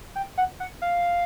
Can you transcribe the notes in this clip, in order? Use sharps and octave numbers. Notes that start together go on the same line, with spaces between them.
G5
F#5
F#5
F5